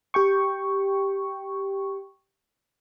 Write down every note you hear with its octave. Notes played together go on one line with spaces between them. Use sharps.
G4 G5 C#6